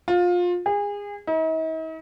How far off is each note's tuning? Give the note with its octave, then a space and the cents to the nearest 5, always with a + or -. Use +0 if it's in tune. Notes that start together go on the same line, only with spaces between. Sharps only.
F4 +25
G#4 -30
D#4 +45